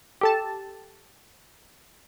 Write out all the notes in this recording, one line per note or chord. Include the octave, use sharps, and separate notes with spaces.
G4 A4 A5